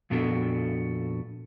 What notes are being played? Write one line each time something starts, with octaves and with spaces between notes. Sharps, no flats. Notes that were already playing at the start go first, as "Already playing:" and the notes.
F2 A#2 B3 D4 F#4 A4